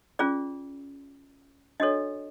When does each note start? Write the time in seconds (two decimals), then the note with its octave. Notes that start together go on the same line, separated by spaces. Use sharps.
0.19 C#4 F4 G#4 D5
1.80 D4 F#4 A4 C#5 D#5